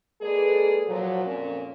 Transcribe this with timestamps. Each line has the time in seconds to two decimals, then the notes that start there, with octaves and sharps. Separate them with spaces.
0.22 G#3 A#3 G#4 A4 B4 D5
0.87 A#2 F3 F#3
1.25 F2 A#2 C#4